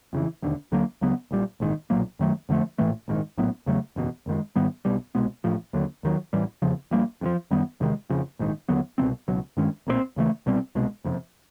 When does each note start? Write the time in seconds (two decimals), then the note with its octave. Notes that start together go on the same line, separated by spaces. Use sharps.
0.13 F2 C#3 E3
0.42 E1 D#2 D3
0.72 D2 D3 F#3 A#3
1.01 C#2 C#3 F#3 B3
1.31 A#1 A#2 G3
1.60 A#1 G#2 D#3
1.90 B1 A#2 F#3 A#3
2.19 F#2 D#3 F#3 A3
2.49 F2 D3 F3 A3
2.78 A#1 A2 E3 A3
3.08 A#1 G#2 D#3
3.37 A#1 A2 F#3 B3
3.66 E2 C#3 F#3 A3
3.96 F#1 E2 B2
4.26 F#1 F#2 D#3 G#3
4.56 G#2 D#3 G3 B3
4.85 B1 B2 G3
5.15 C2 B2 G#3 B3
5.44 A1 A2 F3
5.73 D#2 D3 F#3
6.03 D#2 D#3 F#3
6.33 A1 A2 E3 G3
6.62 F1 E2 C#3 F3
6.91 A#1 A#2 G3 A#3
7.21 F2 C3 F3
7.51 F#2 D#3 G3 B3
7.80 E2 C3 D#3 G#3
8.10 F2 C#3 F3
8.39 A#1 G#2 D#3
8.69 D#2 D3 F#3 B3
8.98 C2 B2 G3 C4
9.28 C#2 B2 F#3
9.57 G2 D#3 G#3 C#4
9.87 B1 A#2 G3 C4
10.16 D#2 C#3 E3 A3
10.46 C2 B2 G3 C4
10.75 C2 B2 G#3
11.04 F#1 F2 C3